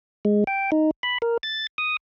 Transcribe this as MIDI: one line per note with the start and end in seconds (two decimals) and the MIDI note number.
0.25 0.44 56
0.47 0.71 79
0.72 0.91 63
1.03 1.18 83
1.22 1.37 70
1.43 1.67 93
1.78 1.97 87